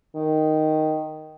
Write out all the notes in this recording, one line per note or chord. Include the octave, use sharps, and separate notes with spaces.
D#3